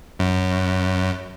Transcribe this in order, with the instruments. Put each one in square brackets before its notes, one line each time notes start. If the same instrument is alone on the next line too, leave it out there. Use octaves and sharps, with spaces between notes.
[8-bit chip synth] F#2